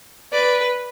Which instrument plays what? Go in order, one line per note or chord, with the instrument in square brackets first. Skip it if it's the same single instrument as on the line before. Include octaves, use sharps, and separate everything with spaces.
[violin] B4 [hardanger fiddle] D5